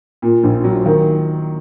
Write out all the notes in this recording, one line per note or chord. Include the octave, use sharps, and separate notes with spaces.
A#2
A#1
F#3
D#3